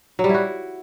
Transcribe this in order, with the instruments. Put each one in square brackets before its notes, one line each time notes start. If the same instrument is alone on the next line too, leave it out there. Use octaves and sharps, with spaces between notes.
[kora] F#3
G3
E4
F#4